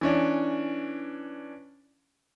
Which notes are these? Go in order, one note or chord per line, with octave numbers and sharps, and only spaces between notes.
E3 C#4 D4